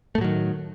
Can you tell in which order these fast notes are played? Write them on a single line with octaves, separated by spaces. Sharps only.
A3 A2 F#3 D#3